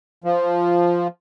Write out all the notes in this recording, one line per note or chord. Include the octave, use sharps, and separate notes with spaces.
F3